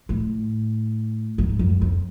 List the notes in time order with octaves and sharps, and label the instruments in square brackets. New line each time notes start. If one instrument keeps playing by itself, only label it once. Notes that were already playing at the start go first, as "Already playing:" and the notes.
[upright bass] A2
G#2
F#2
F2